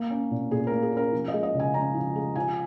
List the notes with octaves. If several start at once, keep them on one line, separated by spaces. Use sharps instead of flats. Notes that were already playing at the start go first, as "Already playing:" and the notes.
Already playing: A#3 A#4
C#4
A#2
A#2 G#4
A#3 A#4
G#4
C#4 A#4
F3
D#5
G#3
D#5
C#3
G#5
C#4 A#5
F3
G#3
F3 G#5